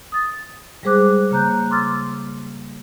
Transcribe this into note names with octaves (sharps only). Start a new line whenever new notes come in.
D#6 A6
G3 G#3 G#4 C5 D6 F#6
C#3 A#3 A#5 F#6 G6
C6 D6 E6 F6 A6